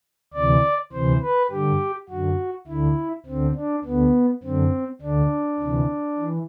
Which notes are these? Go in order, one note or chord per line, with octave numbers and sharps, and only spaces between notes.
D2 C3 E3 D5
D2 C3 E3 C5
B4
G2 D3 G4
F#2 D3 F#4
D2 D3 E4
D2 D3 C4
D4
D2 D3 B3
F#2 D3 C4
D2 D3 D4
D2 C3 E3
E3